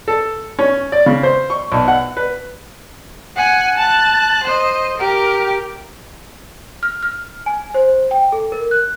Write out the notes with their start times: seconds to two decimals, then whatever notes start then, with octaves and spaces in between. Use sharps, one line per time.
0.08 A4
0.59 C#4
0.92 D5
1.06 C#3
1.23 C5
1.50 C#6
1.72 B1
1.88 F#5
2.17 B4
3.36 F#5 G#5
3.77 A5 F#6
4.44 C5 D#5
4.97 G4 A#4
6.83 F6
7.03 F6
7.46 G#5
7.74 C5
8.11 G5
8.32 A4
8.52 A#4
8.71 F#6